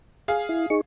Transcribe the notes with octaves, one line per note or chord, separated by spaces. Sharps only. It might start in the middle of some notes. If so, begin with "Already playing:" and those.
G#4 F5
E4
D#4 G#4 C#6